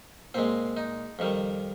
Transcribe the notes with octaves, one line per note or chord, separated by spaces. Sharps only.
A#2 G#3 C4
D#4
F2 D#3 G3